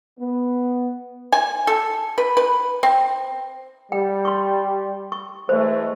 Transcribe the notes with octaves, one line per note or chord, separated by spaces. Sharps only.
B3
G#5
A4
B4
B4
C4
G3 G5
C6 C#6
C#6
E3 G#3 A3 C5